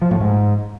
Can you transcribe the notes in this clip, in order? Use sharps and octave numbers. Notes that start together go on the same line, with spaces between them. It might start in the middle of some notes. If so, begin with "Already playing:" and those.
F3
A2
G#2